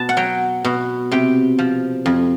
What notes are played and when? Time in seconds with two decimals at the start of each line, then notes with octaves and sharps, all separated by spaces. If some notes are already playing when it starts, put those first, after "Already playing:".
Already playing: B2 A5
0.09 F#5
0.17 F#3 G5
0.65 B2
1.11 C3 G5
1.59 F3
2.06 F2